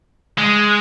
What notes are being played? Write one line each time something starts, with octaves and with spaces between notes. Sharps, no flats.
G#3